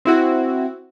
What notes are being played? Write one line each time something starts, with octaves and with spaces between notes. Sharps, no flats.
C4 E4 F#4